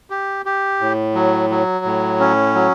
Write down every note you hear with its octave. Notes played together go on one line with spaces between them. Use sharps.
G4
G4
A2
F#3
F#3
A2
C#4
F#3